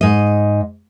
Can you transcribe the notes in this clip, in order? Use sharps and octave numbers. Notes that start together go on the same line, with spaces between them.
G#2 D#5